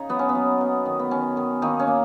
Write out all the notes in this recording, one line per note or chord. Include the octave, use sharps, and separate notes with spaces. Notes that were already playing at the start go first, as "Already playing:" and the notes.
Already playing: C#3 D#4
F#3 B3
C#4
B3
F#3
B3
D#3
B3
D#3 C#4
D#3
D#3 A#3 D#4
C#4
A#3